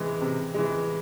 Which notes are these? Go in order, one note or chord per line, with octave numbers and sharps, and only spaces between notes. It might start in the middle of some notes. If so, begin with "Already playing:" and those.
Already playing: C3 E3 G#3
C3
E3 G#3